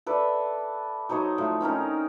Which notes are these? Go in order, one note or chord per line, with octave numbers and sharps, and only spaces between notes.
A4 B4 D5 E5
F#3 D#4 C5 C#5
A2 F3
C4 C#4 D#4 A#4